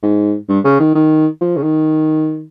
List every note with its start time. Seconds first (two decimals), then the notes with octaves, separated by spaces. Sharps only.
0.03 G#2
0.49 G2
0.64 C#3
0.80 D#3
0.95 D#3
1.41 F3
1.57 C#3
1.63 D#3